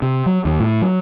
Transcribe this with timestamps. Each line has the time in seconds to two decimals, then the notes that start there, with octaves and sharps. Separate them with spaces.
0.02 C3
0.26 F#3
0.45 D#2
0.60 A2
0.82 F#3